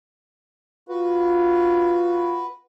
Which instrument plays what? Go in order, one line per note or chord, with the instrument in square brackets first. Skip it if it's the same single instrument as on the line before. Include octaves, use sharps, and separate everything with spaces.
[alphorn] F4 [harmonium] F#4 B4